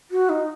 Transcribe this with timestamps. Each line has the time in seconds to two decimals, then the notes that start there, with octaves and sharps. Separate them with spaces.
0.11 F#4
0.29 D#4